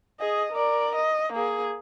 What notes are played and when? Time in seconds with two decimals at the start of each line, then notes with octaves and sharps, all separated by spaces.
0.19 G#4 D#5
0.52 A#4 D5
0.95 D#5
1.33 A#3 G#4